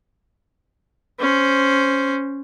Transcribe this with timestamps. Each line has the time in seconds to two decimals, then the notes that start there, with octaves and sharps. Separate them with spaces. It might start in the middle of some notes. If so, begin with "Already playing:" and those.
1.20 C#4 C5